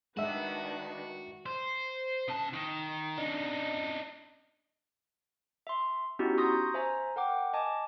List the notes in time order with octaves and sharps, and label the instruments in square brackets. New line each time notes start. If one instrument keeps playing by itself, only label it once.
[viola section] D#3 D4 B4 [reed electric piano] G#3 E5 [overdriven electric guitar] F#4
[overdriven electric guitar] C5
C#3 A5
D#3
D4 D#4
[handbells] E5 C6
B3 C#4 D#4 E4 F#4 G4
A#5 C6 C#6 D#6 G6 A#6
C5 E5 G#5 A#5
A#4 F#5 G5 D6
D#5 G#5 A5 D6